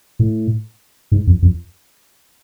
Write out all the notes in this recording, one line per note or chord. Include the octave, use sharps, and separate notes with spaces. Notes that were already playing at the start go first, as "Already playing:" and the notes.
A2
G#2
F2
F2